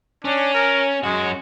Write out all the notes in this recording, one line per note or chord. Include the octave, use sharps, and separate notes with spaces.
C#4 D4
A#4
F#2 G#3 F#4